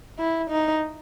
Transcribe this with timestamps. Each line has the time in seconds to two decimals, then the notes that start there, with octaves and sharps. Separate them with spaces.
0.19 E4
0.50 D#4